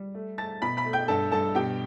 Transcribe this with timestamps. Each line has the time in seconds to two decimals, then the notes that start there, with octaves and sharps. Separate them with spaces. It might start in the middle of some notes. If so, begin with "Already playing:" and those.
Already playing: G3
0.14 A3
0.38 A3 A5 A6
0.62 B2 B5 B6
0.77 B5 B6
0.85 A3
0.93 G5 G6
1.08 G2 A4 A5
1.32 G2 A4 A5
1.55 B2 G4 G5